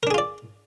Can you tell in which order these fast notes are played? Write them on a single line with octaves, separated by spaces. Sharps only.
A#4 D4 G#4 F4 D5